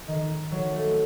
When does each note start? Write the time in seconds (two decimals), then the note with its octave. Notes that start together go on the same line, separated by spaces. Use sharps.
0.08 D#3
0.52 F#3
0.72 A3